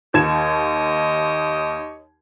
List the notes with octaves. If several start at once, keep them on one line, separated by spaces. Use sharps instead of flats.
D#2 G4 C#5 D#5 G#6 E7